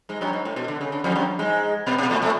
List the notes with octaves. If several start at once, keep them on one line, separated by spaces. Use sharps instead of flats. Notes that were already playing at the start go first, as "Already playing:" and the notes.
G#2 G#3
F#2 F#3
G#2
A2
B2
D3
C#3
D3
F2 F3
F#2 F#3
G#2 G#3
B2 B3
B2 B3
A2 A3
A2 A3